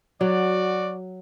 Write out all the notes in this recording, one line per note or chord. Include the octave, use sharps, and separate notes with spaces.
F#3 F#4 D5